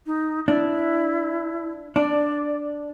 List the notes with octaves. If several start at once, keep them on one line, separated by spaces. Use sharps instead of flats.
D#4
D4 E4
D4 D5